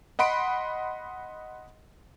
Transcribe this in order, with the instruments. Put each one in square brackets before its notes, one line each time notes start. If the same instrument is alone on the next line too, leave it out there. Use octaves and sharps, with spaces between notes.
[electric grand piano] D#5 F#5 B5 C6 D7